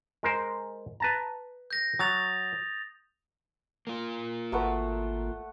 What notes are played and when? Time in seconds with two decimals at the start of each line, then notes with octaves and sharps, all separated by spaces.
0.23 G#3 A#4 C5
1.00 B4 A5 A#5
1.71 G6 A#6
1.99 F#3 D#6 A6 F7
3.87 A#3 F4
4.52 G#1 A3 F#4 A#4 B4 F#5